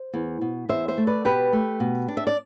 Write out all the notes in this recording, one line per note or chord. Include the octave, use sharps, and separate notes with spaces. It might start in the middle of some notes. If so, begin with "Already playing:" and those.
Already playing: C5
E2
B2
E2 C5 E5
C5 E5
A3
B4 D5
B2 G4 B4
A3
B2
D4
E5
D5